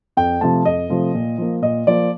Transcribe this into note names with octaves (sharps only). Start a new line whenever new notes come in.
F2 G5
C3 F3 A3 A5
F2 D#5
C3 F3 A3
A#2
F3 A#3
A#2 D#5
F3 A#3 D5